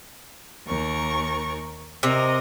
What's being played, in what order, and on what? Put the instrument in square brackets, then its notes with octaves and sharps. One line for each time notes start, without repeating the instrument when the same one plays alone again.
[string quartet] D#2 A#4 C#6
[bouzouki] C3 [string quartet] A#4 D#5